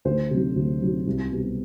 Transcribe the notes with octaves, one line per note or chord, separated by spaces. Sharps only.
D2 C5
C3 F#3
D2
C3 F#3
C2
B2 G3